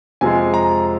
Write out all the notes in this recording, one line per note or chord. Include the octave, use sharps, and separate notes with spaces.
F2 C3 F3 G#3 G#5
A#5